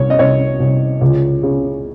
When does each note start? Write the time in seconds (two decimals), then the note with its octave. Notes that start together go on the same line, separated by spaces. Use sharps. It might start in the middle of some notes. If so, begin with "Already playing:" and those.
Already playing: C2 C#5
0.10 D#5
0.19 C2 C#5
0.60 C2
1.01 C#2
1.43 C#3